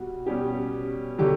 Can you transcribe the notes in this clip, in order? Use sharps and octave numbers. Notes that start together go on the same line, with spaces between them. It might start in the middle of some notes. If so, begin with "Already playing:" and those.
Already playing: B2 G3 F#4
B2 G3 C#4 G4
D3 F#3 G4